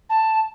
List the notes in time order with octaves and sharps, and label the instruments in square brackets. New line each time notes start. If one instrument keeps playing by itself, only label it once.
[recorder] A5